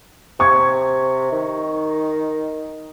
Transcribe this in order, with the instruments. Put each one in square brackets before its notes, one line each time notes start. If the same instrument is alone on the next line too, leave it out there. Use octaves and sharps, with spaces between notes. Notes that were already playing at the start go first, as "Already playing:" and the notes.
[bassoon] C3 [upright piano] C#6 G#6
[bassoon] D#3